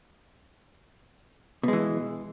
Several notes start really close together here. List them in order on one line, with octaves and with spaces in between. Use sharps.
B2 G#3 E3